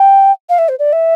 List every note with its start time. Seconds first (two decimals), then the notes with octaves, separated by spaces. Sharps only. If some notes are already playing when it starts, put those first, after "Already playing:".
Already playing: G5
0.49 F5
0.58 E5
0.69 C5
0.79 D5
0.93 E5